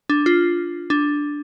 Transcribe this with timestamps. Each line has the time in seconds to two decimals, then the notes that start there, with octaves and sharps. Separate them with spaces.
0.10 D4
0.26 F4
0.90 D4